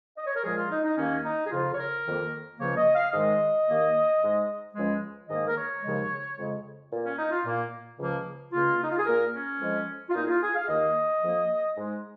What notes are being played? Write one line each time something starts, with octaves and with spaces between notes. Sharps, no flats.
D#5
C#5
A#4
A#2 F3 G#3 G#4
F4
D#4
D#4
D#2 D#3 A#3 C#4
D#4
G#4
F2 C#3 F3 F4
C#5
A#4
F2 D#3 A#3
C#2 C#3 F3 A#3 C#5
D#5
F5
G#2 D#3 G#3 D#5
D#2 D#3 A#3
G#2 G#3
C#2 C#3 F3 G#3
G#2 D#3 A#3 D#5
A#4
C#5
D#2 C#3 F3 G#3
F2 C#3 G#3
A#2 A#3
C#4
D#4
F4
A#2 A#3
C#2 C#3 F3 A#3
C#2 C#3 A#3 F4
D#4
F4
G#4
A#2 A#3 A#4
C#4
F2 F3 G#3
F4
A#2 A#3 D#4
G#4
F4
G#4
F5
D#2 D#3 A#3 D#5
F2 F3 A#3
G#2 G#3